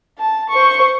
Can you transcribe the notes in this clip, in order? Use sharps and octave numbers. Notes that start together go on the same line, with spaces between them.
A5
C5 C#6